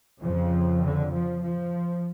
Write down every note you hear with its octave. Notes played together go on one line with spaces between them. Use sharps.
F2 C#3 F3
D3
F3
F3